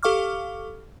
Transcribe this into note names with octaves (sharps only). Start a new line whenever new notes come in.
G4 A4 F5 C#6 D6 F6